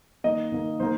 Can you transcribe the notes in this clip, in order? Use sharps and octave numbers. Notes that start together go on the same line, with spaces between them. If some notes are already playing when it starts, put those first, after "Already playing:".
D#3 A#3 D#5
D#3 A#3
D#3 A#3 C5